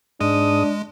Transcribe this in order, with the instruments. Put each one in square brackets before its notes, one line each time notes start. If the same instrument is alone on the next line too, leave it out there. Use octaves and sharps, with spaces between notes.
[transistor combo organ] G#2 D#6 [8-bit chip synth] G#3 [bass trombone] D4